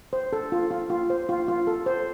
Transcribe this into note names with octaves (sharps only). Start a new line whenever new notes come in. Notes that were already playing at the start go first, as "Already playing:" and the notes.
C5
A4
F4
F4
F4
C5
F4
F4
A4
C5